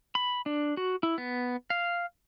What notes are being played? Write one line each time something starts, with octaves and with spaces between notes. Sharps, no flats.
B5
D4
F#4
E4
B3
F5